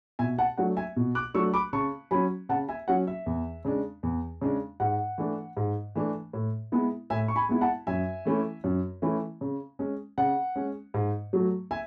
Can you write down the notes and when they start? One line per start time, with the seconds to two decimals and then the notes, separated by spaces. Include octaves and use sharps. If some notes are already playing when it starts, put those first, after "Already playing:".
0.19 B2 E5 G#5
0.38 F#5 A5
0.58 F#3 A3 D4 F#5
0.77 E5 G#5
0.96 B2
1.15 D6 F#6
1.34 F#3 A3 D4 C#6 E6
1.53 B5 D6
1.73 C#3 A5 C#6
2.11 F#3 C#4 G#5 B5
2.49 C#3 F#5 A5
2.69 E5 G#5
2.88 F#3 C#4 F#5
3.07 E5
3.26 E2
3.65 C#3 G#3 D4
4.03 E2
4.42 C#3 G#3 D4
4.80 G#2 F#5
5.18 E3 A3 D4
5.57 G#2
5.95 E3 A3 D4
6.33 A2
6.72 G#3 B3 E4
7.10 A2 E5 G#5
7.28 C#6
7.36 G#5 B5
7.49 G#3 B3 E4
7.61 F#5 A5
7.87 F#2 E5 G#5
8.25 E3 A3 C#4 E4
8.64 F#2
9.02 E3 A3 C#4 E4
9.41 C#3
9.79 G#3 C#4
10.18 C#3 F#5
10.56 G#3 C#4
10.94 G#2
11.33 F#3 A3
11.71 E5 G#5